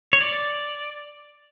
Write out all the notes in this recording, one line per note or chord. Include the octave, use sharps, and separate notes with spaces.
C#5
D5